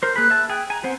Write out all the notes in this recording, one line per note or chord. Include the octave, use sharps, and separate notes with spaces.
A#4 C5 G6
A#3 G#4 B5 F#6
E5 A5
G#4 G5
G#5 A#5
B3 C4 C5 F#5